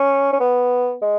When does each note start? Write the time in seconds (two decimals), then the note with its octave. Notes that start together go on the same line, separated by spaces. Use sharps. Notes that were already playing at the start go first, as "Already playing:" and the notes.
Already playing: C#4
0.32 C#4
0.40 B3
1.02 G#3